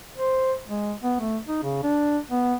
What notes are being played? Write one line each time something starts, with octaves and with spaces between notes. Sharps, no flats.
C5
G#3
B3
A3
D#4
C#3
D4
B3